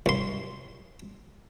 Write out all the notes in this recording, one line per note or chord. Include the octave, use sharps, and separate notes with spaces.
C2 C6